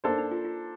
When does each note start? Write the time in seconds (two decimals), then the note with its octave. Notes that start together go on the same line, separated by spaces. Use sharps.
0.04 A#3 D4 D#4 A4 C5
0.18 D#4
0.31 F4
0.44 F4